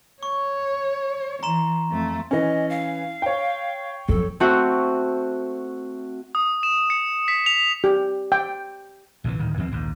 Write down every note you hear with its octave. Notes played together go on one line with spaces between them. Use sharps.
C#5 C#6
E3 A#5 C6 E7
F2 A3
E3 C#4 D#5
F5
C#5 G5
F2 F#3 A4
A3 C4 F#4
D#6
E7
C#7
B6
F7
G4
G5
A#1 C3 D#3 E3
D1 D#3
D#2 F3 C4
A#1 D#2 G#2